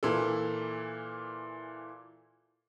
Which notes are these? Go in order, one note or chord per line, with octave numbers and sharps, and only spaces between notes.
A#2 E3 A4